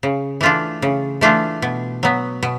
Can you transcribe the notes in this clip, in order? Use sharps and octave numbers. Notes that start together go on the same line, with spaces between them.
C#3
E3 A3 D4 F4
C#3
E3 A3 D4 F4
B2
F#3 B3
B2